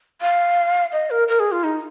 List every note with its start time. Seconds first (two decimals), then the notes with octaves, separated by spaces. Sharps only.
0.21 F5
0.92 D#5
1.10 A#4
1.28 A#4
1.40 G#4
1.52 F4
1.63 D#4